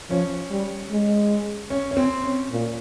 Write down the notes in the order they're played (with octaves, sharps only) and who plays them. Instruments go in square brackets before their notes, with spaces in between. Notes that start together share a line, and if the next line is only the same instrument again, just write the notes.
[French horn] F3 [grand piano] C#4
[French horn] G3
G#3
[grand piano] C#4
C#4
C4
C#4
[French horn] A#2